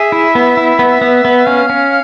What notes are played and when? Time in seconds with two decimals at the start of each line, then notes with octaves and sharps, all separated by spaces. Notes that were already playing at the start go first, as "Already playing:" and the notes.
Already playing: G#4 E5
0.12 E4
0.35 B3
0.57 E4
0.79 B3
1.01 B3
1.25 B3
1.47 C#4 F5
1.70 C#4